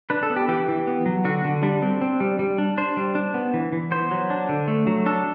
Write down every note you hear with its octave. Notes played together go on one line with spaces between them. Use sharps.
D4 B4
A4
B3
G4
E3 G4
E3
B3
F#3
D3 F#4
D3
G3 D4
C4
C4
G3
G3
D4
D4 C5
G3
D4
B3
E3
E3
B3 C5
F#3
D4
D3
A3
F#3
D4 A4